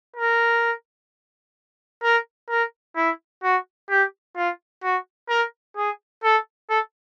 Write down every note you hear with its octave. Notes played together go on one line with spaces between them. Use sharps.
A#4
A#4
A#4
E4
F#4
G4
F4
F#4
A#4
G#4
A4
A4